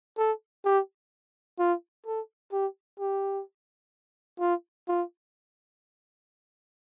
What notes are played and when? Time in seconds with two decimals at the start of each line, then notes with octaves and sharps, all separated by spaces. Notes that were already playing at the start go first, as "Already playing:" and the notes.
0.18 A4
0.65 G4
1.59 F4
2.06 A4
2.52 G4
2.99 G4
4.40 F4
4.88 F4